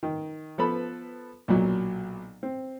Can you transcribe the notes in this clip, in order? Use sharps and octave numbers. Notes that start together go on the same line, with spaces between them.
D#3
F3 B3 A4 B4 A5 B5
B1 A#2 F#3
C4